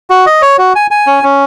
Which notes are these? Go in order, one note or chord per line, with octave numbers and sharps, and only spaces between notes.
F#4
D#5
C#5
F#4
G#5
G#5
C#4
C#4